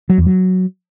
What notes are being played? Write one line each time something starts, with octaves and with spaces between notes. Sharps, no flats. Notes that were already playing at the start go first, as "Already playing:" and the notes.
F#3
E2
F#3